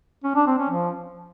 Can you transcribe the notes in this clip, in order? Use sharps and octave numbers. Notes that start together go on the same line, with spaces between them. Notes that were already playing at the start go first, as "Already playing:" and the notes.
C#4
D4
C4
C#4
F3